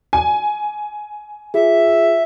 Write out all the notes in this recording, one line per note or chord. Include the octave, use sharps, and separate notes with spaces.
G#5
F4 G#4 E5